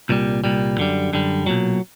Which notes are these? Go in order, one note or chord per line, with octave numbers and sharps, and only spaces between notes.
C2 A#2 G3
C2 A#2 G3
F#2 D3 G3
F#2 D3 G3
B1 A#2 F#3